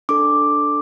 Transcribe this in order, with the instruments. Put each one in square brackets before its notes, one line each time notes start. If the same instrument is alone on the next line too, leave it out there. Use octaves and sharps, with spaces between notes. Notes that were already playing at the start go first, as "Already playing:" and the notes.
[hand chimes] D4 A4 D6